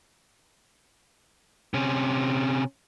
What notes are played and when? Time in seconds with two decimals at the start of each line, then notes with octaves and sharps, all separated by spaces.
1.74 C3 C#4